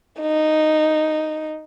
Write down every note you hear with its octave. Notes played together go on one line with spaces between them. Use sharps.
D#4